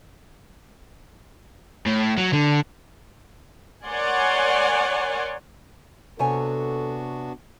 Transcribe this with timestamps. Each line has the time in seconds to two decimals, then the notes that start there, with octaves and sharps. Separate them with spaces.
1.86 A2
2.18 F#3
2.33 D3
3.86 A#4 C#5 D5 F#5 G#5 C6
6.19 C3 B3 D4 F#4 A4 C#5 G#5